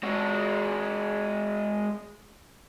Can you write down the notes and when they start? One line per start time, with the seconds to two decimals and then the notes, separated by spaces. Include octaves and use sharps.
0.03 G#3 F#4